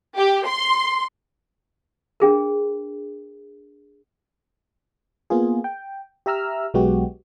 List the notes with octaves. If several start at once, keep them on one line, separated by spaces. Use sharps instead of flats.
G4
C6
D4 G#4 A#4
A#3 B3 F4 G#4
G5
G4 E5 A#5 E6 F6
B1 F#3 G#3 B3 F#4 G4